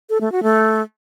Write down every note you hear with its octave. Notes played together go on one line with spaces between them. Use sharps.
A4
A3
F#4
A3